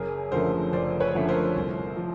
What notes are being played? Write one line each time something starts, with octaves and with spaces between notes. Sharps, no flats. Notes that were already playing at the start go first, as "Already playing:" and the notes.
Already playing: F#1 G#4 A#4
F#2 D3 F3 A3 A#4 C5
F#1 C5 D5
B4 C#5
F#2 D3 F3 A3
A#4 C5
C2
F3